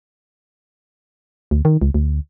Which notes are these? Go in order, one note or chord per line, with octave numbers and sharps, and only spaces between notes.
D2
D#3
C#2
D2